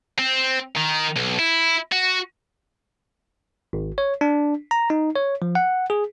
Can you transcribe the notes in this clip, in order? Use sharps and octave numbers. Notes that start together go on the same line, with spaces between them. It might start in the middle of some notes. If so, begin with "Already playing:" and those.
C4
D#3
B1
E4
F#4
G#1
C#5
D4
A#5
D#4
C#5
F3
F#5
G#4